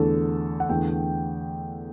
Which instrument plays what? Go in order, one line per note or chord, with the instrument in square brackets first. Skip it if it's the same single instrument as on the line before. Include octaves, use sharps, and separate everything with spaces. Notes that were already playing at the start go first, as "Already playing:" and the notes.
Already playing: [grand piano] E2 D3 A3 A4
F#5
E2 D3 A3 G5